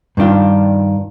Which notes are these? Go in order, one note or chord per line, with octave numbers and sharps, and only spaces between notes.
G2 D#3 D4 F4